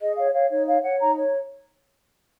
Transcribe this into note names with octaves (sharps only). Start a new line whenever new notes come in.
G#4 D#5
C#5 F5
C#5 F5
D#4 C#5
C#5 F5
C#5 F#5
D#4 A#5
C#5